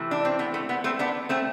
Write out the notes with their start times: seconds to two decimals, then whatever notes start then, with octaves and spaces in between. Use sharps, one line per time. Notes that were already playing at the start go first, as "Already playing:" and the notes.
Already playing: C3 E3 A3
0.11 D4
0.25 C4
0.39 B3
0.54 A3
0.69 B3
0.84 A3 C4
0.99 B3 D4
1.29 A3 C4